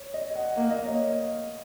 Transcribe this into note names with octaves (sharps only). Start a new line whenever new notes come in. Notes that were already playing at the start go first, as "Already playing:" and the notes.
Already playing: C#5
D#5
F#5
A#3 F5
D#5
C#5